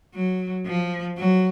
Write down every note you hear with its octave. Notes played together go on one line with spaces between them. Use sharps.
F#3
F3
F#3